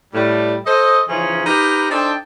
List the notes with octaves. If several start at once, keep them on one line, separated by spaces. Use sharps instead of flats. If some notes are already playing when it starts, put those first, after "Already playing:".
A2 G3
A4 C5 D#5
C#3 E3 F3 C#4 D#4
D#4 G4 A#4 B4
D4 D#4 A4 C5 G5